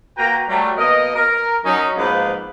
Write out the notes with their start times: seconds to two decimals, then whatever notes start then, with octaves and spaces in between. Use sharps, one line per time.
0.17 A#3 F#4 B4 G5 A#5
0.48 F#3 G3 A3
0.77 B2 A#3 A#4 D#5
1.15 A#4
1.65 F#3 C#4 D#4
1.97 G#2 F3 A#3 B3 B4